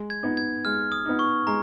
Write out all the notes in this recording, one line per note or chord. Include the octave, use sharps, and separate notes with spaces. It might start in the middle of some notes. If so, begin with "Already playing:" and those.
Already playing: G#3
G#6
B3 D#4
G#6
G#3 F6
D#6
B3 D#4
C#6
G#3 A#5